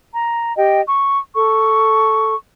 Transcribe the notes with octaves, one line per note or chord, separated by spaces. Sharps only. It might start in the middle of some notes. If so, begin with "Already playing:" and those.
A#5
G4 D#5 G5
C#6
A4 C#6